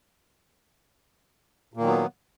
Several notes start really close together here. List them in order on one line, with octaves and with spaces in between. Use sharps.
A#2 A#3 D#3 F#3 B3